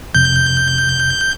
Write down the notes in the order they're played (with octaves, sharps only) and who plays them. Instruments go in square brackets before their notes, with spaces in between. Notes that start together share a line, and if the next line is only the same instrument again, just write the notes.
[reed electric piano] F2 C3 [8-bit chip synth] G6